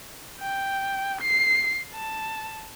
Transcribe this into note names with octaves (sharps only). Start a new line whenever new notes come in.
G5
C7
A5